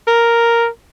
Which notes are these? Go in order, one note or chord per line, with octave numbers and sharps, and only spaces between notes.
A#4